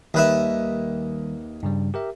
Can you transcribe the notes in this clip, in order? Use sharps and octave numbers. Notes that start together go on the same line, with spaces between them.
D#2 D#3 G3 B4 E5
G2 C#3 G3
G4 A#4 E5